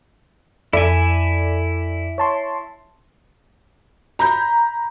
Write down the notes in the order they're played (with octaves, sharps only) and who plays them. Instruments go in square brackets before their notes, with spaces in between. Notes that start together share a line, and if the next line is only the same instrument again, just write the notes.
[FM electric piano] F2 A4 D5 [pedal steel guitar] E4 E5 G#5
[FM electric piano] C#5 A5 C6
[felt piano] A#5 B5 G6